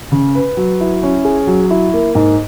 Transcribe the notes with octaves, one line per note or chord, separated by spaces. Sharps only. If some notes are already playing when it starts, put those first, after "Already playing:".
C#3
B4
F#3
E4
C#4
G#4
F#3
E4
A#3
G#2